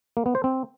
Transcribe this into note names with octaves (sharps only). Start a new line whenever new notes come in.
A#3
B3
C5
C4